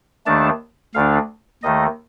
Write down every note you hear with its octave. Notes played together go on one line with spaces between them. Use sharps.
D#2 D#3 A3 D4 A5
D2 D3 A3 D4 F5
D#2 D#3 A3 D#5